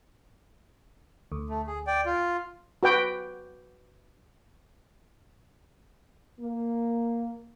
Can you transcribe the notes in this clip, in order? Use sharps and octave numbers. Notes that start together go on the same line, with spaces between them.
D2
A3
G#4
D5 G5
F4
F#4 B4 G5
A#3